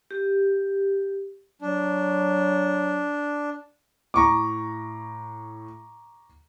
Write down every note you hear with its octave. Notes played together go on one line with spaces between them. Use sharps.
G4
F#3 D4
A2 A#5 C#6 D6